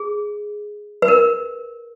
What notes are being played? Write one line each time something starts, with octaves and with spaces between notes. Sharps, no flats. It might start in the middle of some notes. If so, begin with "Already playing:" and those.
Already playing: G#4
B4
A#4